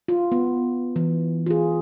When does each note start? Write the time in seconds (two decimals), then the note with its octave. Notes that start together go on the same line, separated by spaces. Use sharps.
0.08 F4
0.32 B3
0.96 E3
1.46 F4 G#4